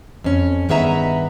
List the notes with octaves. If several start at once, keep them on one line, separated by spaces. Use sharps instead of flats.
F2 C#4
G2 D#3 B3 G#4 E5 A#5